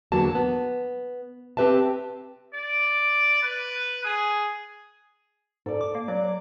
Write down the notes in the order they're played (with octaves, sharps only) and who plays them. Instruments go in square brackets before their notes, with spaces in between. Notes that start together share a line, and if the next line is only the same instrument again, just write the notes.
[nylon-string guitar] E2 D3 F#3 A#3 F#4 A5
B3
C4 G4 B4 E5 A5
[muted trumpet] D5
B4
G#4
[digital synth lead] G#2 [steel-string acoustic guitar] A4 D5
[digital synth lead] D6
A#3
[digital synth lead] F#3 [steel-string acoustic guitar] D5